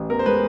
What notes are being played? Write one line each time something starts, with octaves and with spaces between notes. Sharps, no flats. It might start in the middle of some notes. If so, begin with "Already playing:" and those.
Already playing: A1
E2 A#4
C5
G#3 B4